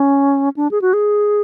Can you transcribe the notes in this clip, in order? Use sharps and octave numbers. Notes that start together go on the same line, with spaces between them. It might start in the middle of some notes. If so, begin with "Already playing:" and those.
Already playing: C#4
D4
G#4
F#4
G#4